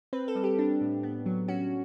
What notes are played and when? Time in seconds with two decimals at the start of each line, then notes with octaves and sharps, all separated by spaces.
0.13 C4 B4
0.28 A4
0.35 G3
0.44 G4
0.59 D4
0.81 A2
1.03 B3
1.26 F#3
1.48 C#4 F#4